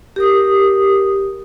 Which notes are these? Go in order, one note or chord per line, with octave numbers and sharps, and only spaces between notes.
G4 A#4 D#6